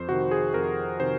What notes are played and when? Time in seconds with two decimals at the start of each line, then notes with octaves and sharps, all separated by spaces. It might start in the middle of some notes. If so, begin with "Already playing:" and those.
Already playing: F2 C5
0.09 C3 D#3 F#4
0.31 G#4
0.54 F2 A#4
1.00 C3 D#3 C5